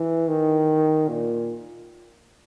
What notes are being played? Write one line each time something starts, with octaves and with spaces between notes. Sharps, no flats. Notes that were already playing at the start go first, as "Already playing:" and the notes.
Already playing: E3
D#3
A#2